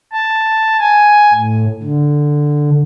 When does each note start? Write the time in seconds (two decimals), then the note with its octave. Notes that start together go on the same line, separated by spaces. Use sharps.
0.12 A5
0.79 G#5
1.34 A2
1.83 D3